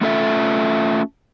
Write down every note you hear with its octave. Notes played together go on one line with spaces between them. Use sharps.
A3 C#4 F4 A4 D5 E5